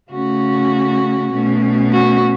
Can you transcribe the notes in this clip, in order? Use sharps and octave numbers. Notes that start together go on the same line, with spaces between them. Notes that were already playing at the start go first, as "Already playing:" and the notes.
C#3 A3 C#4 F#4
B2 A3 C#4
F#4